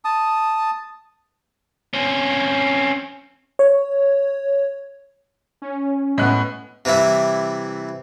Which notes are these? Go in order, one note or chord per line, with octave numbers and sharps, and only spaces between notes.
A5 D#6
C4 C#4
C#5
C#4
A2 G#3 B3 F#6
C3 E3 G3 E4